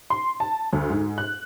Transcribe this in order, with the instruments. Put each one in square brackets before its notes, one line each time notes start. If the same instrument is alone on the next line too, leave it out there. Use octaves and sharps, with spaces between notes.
[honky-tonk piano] C6
A5
D2
G#2
F#6